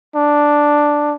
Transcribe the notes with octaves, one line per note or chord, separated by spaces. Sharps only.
D4